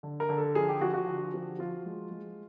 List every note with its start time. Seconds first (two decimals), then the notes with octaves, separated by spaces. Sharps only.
0.03 D3
0.20 A#4
0.29 D3
0.38 A4
0.55 F3 G#4
0.68 G4
0.81 F3 F#4
0.94 F#4
1.07 D3
1.34 F3
1.59 F3 F4
1.86 G#3
2.11 G#3